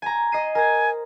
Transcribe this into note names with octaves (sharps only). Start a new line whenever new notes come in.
G#5 A#5
D#5 C7 D#7
A#4 C5 G#5